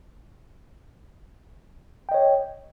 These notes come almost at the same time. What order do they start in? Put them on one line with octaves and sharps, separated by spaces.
G5 D#5 C#5